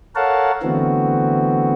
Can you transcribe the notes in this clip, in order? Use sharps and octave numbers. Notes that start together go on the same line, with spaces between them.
A4 A#4 C#5 F5 F#5 A5
D3 E3 A3 B3 C4 F#4